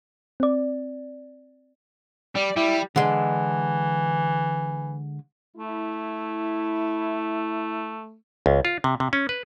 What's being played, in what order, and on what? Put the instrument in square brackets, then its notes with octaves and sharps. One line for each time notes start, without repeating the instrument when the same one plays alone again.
[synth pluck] C4 D5
[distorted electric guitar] G3 [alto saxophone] D5
[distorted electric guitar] G3 [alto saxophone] E4
[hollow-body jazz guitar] D3 G#3 D4 [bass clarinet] E3
[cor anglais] A3 [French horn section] E4
[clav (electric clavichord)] C#2
F4
C3
C3
C#4
B4